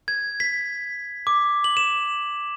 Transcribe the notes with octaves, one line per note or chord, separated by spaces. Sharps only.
G#6
B6
D6
F#7
E7